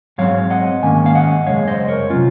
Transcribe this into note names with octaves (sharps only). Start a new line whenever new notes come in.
G#2 F#3 C4 C#5 F5
D#5 F#5
G#2 D#3 A#3 C#4 G#5
F5
D#5 F#5
F#2 C#3 G#3 C#5 F5
C5 D#5
A#4 C#5
C3 F#3 C#4 F4